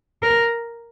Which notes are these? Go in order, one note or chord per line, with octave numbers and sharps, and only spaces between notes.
A#4